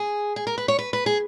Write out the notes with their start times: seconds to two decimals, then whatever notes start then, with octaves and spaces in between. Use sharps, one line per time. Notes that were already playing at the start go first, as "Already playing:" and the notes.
Already playing: G#4
0.36 G#4
0.47 A#4
0.58 B4
0.68 C#5
0.79 B4
0.93 B4
1.06 G#4